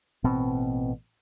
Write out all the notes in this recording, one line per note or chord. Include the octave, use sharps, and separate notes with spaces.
A1 B2 C4